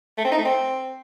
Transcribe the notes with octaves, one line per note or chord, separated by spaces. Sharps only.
A3
C4
D#4
A3
C4